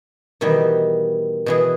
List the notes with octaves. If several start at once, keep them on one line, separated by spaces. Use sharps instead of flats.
B2 D#3 E3 G3
B2 E3 G#4